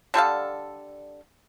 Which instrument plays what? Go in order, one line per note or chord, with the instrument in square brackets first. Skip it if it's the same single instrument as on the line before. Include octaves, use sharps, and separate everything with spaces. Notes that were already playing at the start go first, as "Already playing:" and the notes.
[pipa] D3 G3 A4 F5